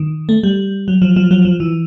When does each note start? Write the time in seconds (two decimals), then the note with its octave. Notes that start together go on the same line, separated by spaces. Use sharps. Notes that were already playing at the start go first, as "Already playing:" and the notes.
Already playing: D#3
0.29 A3
0.43 G3
0.88 F#3
1.02 F3
1.16 F3
1.31 F#3
1.45 F3
1.60 E3